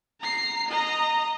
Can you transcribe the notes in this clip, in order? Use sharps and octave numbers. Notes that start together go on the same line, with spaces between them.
A#5 C7
D#5 A#5